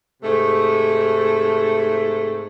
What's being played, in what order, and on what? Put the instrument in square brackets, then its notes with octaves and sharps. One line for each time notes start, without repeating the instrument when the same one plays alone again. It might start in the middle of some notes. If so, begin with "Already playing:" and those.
[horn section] G#2 C3 A3